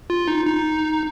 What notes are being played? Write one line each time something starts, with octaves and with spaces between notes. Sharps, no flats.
F4
D#4
D#4